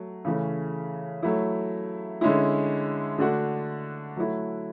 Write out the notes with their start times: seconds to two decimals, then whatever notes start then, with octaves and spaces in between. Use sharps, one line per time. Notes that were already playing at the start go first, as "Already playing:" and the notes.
Already playing: F#3 A3
0.25 C#3 E3 A3 C#4
1.23 F#3 A3 E4
2.21 D3 G#3 C#4 E4
3.18 D3 A3 D4 F#4
4.17 F#3 A3 E4